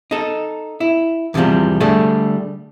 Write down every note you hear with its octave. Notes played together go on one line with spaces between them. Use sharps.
D#4 A4
E4
E2 C3 D#3 F3 G3
D3 G3 A3 G#4 A4